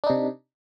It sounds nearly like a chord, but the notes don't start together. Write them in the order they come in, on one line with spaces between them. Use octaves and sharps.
D4 D#4 C3